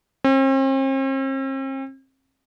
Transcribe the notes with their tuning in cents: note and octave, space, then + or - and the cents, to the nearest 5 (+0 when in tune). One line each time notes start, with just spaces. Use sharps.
C4 +45